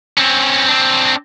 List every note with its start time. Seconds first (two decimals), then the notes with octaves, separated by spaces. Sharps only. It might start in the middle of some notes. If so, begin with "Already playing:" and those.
0.18 C4 C#4
0.68 C4 D4